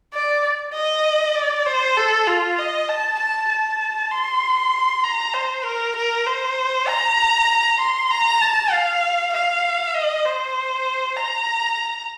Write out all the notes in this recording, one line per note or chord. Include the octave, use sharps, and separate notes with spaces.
D5
D#5
D5
C5
A4
F4
D#5
A5
A5
A5
C6
A#5
C5
A#4
A#4
C5
A#5
C6
A#5
A5
F5
F5
D#5
C5
A#5